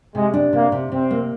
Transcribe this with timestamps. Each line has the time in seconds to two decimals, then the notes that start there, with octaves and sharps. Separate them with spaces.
0.14 C3 G#3
0.34 D4
0.53 C3 A#3
0.72 C3
0.91 C3 C4
1.11 A#3